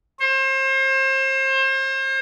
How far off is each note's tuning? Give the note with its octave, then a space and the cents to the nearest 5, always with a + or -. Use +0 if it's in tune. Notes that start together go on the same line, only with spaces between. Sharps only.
C5 +35